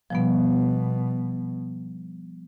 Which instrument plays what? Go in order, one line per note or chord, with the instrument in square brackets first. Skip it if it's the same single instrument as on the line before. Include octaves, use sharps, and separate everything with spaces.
[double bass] B2 [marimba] F3 G3 B3